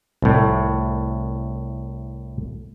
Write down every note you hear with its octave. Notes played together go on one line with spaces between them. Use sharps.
C2 A2